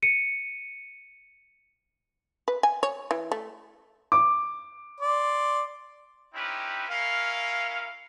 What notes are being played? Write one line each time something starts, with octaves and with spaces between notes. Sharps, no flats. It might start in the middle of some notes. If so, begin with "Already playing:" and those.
C#7 D#7
B4
G#5
C#5
E3
A3
D6
D5 C6
C4 C#4 D#4 E4 G4 B4
C#4 E4 A#4 F5